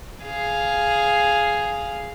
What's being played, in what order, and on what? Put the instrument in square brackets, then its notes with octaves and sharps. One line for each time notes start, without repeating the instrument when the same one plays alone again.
[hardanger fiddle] G#4 F5